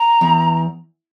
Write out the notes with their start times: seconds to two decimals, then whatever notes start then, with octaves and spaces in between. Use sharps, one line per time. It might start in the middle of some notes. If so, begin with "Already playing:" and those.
Already playing: A#5
0.21 E2